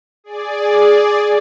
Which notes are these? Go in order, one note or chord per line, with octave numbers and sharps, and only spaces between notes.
G#4 D5